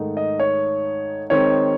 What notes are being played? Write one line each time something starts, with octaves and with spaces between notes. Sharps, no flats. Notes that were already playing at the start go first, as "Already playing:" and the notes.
Already playing: G#2 D#3 A3 D#4
D#5
C#5
D#3 G#3 C4 D#4 C#5